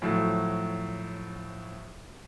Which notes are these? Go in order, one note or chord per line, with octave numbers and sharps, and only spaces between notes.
A2 F3 F#3